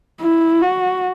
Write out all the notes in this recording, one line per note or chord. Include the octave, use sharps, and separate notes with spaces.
E4
F#4